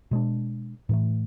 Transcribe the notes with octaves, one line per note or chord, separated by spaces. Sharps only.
B2 G#3 D4
A2 E3 A3